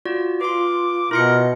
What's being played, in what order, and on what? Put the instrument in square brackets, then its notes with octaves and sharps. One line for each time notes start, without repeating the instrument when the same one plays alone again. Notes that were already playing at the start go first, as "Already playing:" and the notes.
[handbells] F4 F#4 D5
[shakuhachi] F4 [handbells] B4 C6 [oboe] D6
[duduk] B2 [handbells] E4 C6 C#7 [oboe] A#4